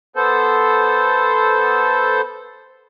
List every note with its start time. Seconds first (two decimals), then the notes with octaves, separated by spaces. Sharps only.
0.16 B3 A4 C5